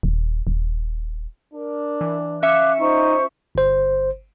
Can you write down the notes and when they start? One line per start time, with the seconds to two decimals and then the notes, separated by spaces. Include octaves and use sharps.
0.03 D#1
0.47 D#1
1.54 D4 A#4
2.01 E3
2.43 C#4 E5 F5 D6 F#6 C#7
2.79 D#4 F4 C5 C#6
3.55 G1 C5